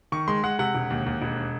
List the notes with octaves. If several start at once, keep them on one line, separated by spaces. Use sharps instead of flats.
D#3 C#6
G#3 C6
G#3 F#5
C3 F#5
E1
D#2
D#2
E1